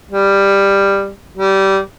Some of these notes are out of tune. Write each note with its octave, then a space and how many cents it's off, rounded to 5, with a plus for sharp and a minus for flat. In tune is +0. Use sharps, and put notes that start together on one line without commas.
G3 +10
G3 -20